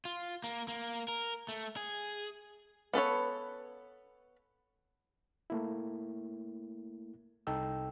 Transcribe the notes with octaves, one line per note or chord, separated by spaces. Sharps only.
F4
A#3
A#3
A#4
A3
G#4
B3 A4 B4 C#5
A3 A#3 E4
C2 D#4 A4 G5 E6